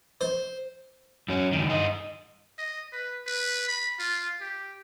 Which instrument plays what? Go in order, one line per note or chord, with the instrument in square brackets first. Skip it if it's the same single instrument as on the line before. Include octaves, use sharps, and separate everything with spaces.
[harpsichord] C5
[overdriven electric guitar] F#2 C#4
C#2 D#3
G2 D#5
[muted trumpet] D#5
B4
B4
B5
F4
G4